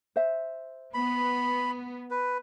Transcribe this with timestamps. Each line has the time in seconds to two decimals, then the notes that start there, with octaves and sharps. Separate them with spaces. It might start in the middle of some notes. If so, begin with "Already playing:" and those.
0.16 C5 E5
0.94 B3 B5
2.11 B4